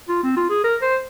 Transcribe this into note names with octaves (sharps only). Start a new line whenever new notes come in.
F4
C4
F4
G#4
A#4
C5